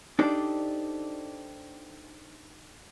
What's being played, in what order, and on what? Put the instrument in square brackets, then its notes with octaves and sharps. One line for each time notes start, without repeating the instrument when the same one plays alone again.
[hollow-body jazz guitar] D4 D#4 G4 A4 C5 D5